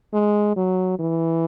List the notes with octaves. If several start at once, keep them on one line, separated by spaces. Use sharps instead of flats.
G#3
F#3
E3